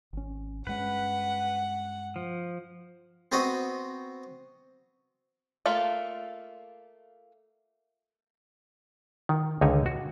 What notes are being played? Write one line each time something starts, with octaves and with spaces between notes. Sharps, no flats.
G#1 C#4
G2 G#3 C#4 B4 F#5
F3
B3 C4 F#4 D#5 F#5
A3 A#3 F4 A4
D#3
C#2 D3 D#3 D#4 C#5 G#5
F#4